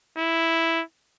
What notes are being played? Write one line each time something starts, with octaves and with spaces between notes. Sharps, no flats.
E4